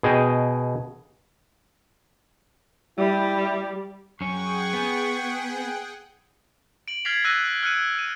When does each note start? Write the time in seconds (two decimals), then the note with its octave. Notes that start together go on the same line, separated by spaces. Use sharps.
0.03 B2 G#4 D#5 G5
2.98 G3 E4
4.21 F#2 C#4 G#4 F#5 G5 C#6
4.73 B3
6.88 D7 F#7
7.05 F6 G#6 A6 B6 C7 F7
7.24 E6 F#6 A#6 D#7
7.63 F6 F#6 C#7 D#7
7.99 D#7